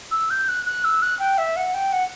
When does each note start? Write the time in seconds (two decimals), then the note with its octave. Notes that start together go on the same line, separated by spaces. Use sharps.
0.11 E6
0.31 G6
0.49 F#6
0.66 F#6
0.85 E6
1.02 F#6
1.20 G5
1.38 E5
1.56 F#5
1.74 G5
1.93 F#5